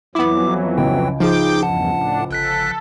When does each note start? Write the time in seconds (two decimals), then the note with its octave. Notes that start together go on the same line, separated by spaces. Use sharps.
0.15 F2 E3 F#3 B3 E4 D6
0.78 C#2 G5
1.20 F3 D#4 G#4 G5 D6
1.63 E2 G2 F#5 A5
1.92 A2 D4
2.31 G1 A4 F#6 B6